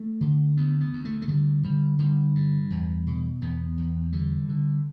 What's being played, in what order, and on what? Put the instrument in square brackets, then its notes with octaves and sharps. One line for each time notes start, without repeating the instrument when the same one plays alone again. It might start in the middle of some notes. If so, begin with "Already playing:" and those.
Already playing: [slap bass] A3
D3
D2 B3
B3
D2
A3
A3
D3 G3
D3 G3
D3 G3
G2
E2
B2
E2 B3
E2
D3 G3
D3